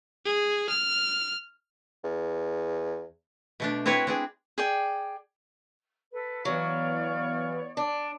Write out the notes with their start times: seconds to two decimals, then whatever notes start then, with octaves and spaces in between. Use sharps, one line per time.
0.25 G#4
0.69 F6
2.04 E2
3.60 B2 A3 D4
3.86 C4 E4 F#4 B4 C#5
4.07 C4 D4 G#4
4.58 G#4 D5 G5
6.12 A4 B4
6.45 E3 F#3 B3 C#5 D5 F5
7.77 D4 D5